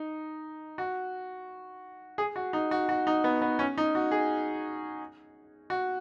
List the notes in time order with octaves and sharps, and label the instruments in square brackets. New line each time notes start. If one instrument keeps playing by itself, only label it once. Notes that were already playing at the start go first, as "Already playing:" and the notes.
Already playing: [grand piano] D#4
F#4
G#4
F#4
D#4
F#4
F#4
D#4
B3
B3
C#4
D#4
F#4
G#4
F#4